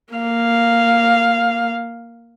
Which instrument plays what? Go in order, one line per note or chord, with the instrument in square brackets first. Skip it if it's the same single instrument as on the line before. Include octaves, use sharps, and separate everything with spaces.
[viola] A#3 F5